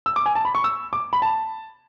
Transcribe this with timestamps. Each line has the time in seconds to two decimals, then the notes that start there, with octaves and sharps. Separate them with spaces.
0.06 E6
0.16 D6
0.26 G#5
0.35 A5
0.45 B5
0.55 C#6
0.64 E6
0.93 D6
1.13 B5
1.22 A5